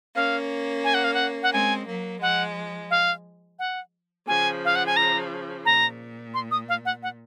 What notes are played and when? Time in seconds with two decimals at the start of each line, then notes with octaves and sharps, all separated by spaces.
0.15 A#3 C#4 F5
0.84 G#5
0.94 F#5
1.04 F5
1.14 F#5
1.43 F#5
1.53 G#3 C4 G#5
1.87 F#3 A#3
2.21 F3 G#3 F#5
2.90 F5
3.59 F#5
4.27 C#3 F3 G#5
4.65 F5
4.75 F#5
4.86 G#5
4.96 A#5
5.65 A#2 A#5
6.34 C6
6.51 D#6
6.69 F5
6.85 F#5
7.03 F#5